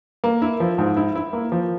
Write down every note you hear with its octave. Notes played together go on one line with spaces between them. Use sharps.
A#3
E4
F3
G#2
E4
E4
A#3
F3